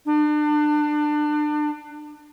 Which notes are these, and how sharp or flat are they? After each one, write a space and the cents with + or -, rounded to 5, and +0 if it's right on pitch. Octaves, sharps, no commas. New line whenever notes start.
D4 +30